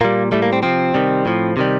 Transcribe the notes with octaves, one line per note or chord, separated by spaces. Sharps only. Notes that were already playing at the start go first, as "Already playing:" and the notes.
A#2 G3 A#3
A2 G3 A3
A#3
C4
C3 F3 C4
C3 D#3 G3
A2 F3
C3 D#3 G3